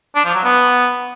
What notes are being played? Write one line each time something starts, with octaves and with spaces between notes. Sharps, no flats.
D4
F3
F#3
B3